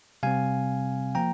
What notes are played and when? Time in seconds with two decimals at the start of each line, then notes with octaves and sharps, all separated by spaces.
0.23 C3 G3 C4 F5 G#5
1.15 F3 A#3 G5 A#5